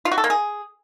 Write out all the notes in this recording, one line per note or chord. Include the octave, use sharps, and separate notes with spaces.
F4
F#4
A4
A#3
G#4